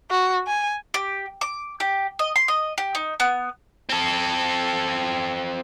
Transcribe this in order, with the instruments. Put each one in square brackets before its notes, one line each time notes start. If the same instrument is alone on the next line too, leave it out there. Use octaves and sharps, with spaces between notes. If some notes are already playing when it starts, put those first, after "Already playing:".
[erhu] F#4
G#5
[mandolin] G4
D6
G4
D#5
C6
D#5
G4
D#4
B3
[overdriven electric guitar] C4 A4